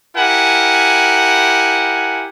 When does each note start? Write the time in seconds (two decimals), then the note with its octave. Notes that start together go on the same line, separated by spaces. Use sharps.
0.16 E4 G4 A#4 F#5 G#5